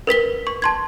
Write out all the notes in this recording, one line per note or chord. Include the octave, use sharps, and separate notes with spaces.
A#4 B4 B6 G7
C#6
A5 C6 G#6